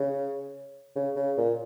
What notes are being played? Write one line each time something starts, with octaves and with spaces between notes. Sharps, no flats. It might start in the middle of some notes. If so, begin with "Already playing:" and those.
Already playing: C#3
C#3
C#3
A#2